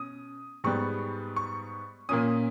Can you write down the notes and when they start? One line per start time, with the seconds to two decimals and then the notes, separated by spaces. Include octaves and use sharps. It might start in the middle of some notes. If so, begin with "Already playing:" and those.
Already playing: B2 C#4 D#6
0.64 G#2 G3 B3 C#6
1.36 C#6
2.09 A#2 A#3 C#4 D#6